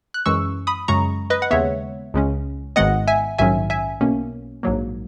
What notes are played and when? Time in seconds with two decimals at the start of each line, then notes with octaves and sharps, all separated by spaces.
0.14 F#6
0.26 F#2 E3 G#3 C#4 C#6 E6
0.67 B5 D#6
0.88 F#2 C#3 G#3 C#4 A#5 C#6
1.30 B4 D#5
1.42 F#5
1.51 D#2 C#3 G#3 B3 C#5 E5
2.14 C#2 C#3 G#3 C#4
2.76 G#1 G#2 D#3 G#3 B3 D#5 F#5
3.08 E5 G#5
3.38 A#1 G#2 D#3 F#3 C#4 E5 G#5
3.70 E5 G#5
4.01 B1 B2 A#3 C#4
4.63 A#1 G#2 F#3 A#3